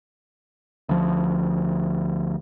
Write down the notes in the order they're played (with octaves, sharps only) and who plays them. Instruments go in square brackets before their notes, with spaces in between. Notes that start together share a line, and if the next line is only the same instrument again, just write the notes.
[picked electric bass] D2 F3